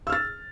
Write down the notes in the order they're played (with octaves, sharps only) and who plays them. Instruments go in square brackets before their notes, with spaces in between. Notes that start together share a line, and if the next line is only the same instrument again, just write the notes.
[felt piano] E6
F6
A6